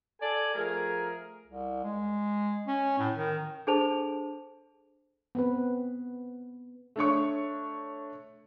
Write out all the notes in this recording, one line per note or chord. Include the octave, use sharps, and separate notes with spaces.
A4 D5 G#5
F3 A3 G#4 A#4
C2
G#3
C#4
A2
D#3
D4 G#4 A4 C5 A5 F7
B3 C4 B4
A3 D4 C#5 C#6